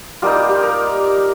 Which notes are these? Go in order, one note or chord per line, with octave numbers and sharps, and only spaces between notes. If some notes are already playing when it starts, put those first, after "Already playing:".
G3 A#3 D#4 F4
G4
G4
A#4